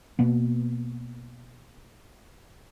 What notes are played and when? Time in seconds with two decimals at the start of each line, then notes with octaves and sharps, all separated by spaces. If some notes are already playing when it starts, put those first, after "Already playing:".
0.19 B2 A#3 B3